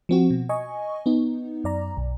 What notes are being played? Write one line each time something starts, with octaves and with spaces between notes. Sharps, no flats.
F3 C4 F#4
B2
D#5 G#5 C#6
B3 D#4
F#2 D5 A#5
B1